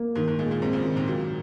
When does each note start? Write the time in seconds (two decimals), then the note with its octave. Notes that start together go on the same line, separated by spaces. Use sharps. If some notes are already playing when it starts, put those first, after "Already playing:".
Already playing: A#3
0.16 G#2 D#3
0.28 G#2
0.39 A#2 G#3
0.51 A#2
0.62 G#2 C3 C4
0.73 A#2 C#3
0.85 D#3
0.96 G#2 C3
1.07 A#2 F#3